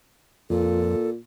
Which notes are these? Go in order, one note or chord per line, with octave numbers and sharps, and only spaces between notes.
F2 A#2 A4